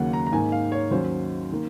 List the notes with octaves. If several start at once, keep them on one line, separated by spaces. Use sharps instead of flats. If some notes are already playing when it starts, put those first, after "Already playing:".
Already playing: D#2 C#3 F#3 A#3 C#4 F#5
A#5
A#5
G#2 D#3 A#3 D#4 G#5
F5
C#5
D#2 D#3 F#3 C#4 C5
D#3 A#3